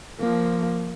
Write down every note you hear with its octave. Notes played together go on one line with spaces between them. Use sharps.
F3 A#3